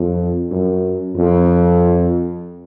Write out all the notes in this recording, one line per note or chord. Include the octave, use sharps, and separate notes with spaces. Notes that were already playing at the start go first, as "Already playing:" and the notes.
Already playing: F2
F#2
F2